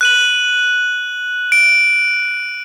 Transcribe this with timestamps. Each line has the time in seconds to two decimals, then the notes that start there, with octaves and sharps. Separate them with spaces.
0.01 F#6 D#7 F#7
1.52 D7